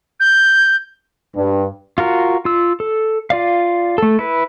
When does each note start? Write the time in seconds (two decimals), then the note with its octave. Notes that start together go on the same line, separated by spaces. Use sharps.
0.20 G6
1.35 G2
1.98 F4 F#4 A#4
2.45 F4 E6
2.80 A4
3.30 F4 D5 F5
3.98 A3 A4
4.19 E4 B4